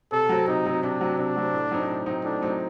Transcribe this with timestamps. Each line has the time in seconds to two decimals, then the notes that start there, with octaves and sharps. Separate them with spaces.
0.12 C3 A4
0.29 F#3 C4 F#4
0.48 C3 D#4
0.65 F#3 C4 F#4
0.83 C3 D4
1.01 F#3 C4 F#4
1.18 C3 D4
1.36 F#3 C4 F#4
1.54 A2
1.71 F#3 C4 D#4
1.88 A2
2.06 F#3 C4 D#4
2.24 A2 D4
2.42 F#3 C4 D#4